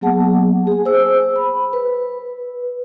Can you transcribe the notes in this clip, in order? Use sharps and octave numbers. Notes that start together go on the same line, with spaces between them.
F#3 A#3 B3 G#4 F#5 A5
G#4 G#5
C5 E6
B5
B4